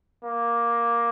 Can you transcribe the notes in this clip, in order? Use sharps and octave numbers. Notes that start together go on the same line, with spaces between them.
A#3